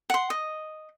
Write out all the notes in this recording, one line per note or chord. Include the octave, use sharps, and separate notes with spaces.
F#5 C6
D#5